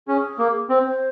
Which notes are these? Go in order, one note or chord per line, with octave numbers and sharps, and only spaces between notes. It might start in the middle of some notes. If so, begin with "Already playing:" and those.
C#4 G#4
A#3
C4 C5